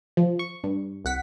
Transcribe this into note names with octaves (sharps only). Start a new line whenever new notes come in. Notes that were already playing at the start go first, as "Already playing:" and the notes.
F3
C#6
G2
C2 F#5 B6